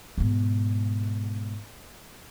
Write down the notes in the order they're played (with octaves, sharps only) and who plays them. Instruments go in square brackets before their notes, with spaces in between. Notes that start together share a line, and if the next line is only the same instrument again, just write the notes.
[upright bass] G#2 B2